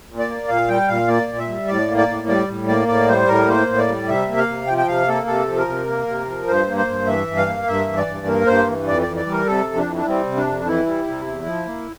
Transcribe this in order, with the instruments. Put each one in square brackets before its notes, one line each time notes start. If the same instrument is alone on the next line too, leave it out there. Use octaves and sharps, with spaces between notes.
[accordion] A#2
D5
A#3
A#2 F5
G3 G5
A#2 F5
A#3 D5
A#2
E5
G3
A2 D5
A#3
D5
A2
G3 D5
A2
A#3 D5
A2 D5
G3 C5
A2 A#4
A#3 C5
A2
D5
G3
C3 E5
A#3
F5
C3
F3 G5
G5
C3 F5
A#3 A4
C3 A4
F3
A#4
C3
A#3
C3
F3
G2 C5
A#3
C5
G2
E3 E5
G2
F5
A#3
G2 E5
E3
D5
G2
A#3 A#4
G2 C5
E3
F2 D5
D5
E3
D5
G3
A#4
C3 A4
F2
D4
E3
D4
G3 C4
C3
D4
F2
E3 E4
G3
C3
E2
F3
A#3